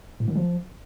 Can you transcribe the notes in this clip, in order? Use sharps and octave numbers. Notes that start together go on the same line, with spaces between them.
A2
D#3
F3